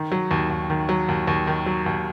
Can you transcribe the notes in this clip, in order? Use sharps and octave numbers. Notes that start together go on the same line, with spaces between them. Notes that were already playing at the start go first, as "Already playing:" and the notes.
Already playing: D#3
F#3
D#2
D#2
D#3
F#3
D#2
D#2
D#3
F#3
D#2